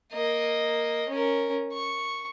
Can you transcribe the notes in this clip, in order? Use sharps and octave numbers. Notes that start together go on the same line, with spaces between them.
A#3 D#5
C#4 A#4
C#6